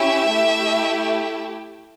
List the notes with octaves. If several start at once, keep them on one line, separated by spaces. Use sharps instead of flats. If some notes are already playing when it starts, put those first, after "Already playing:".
Already playing: C#4 E4 G4 E5
A3 E4 G4